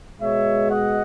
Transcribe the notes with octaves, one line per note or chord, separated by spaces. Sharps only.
B2 G#3 C#5 E5
D#5 F#5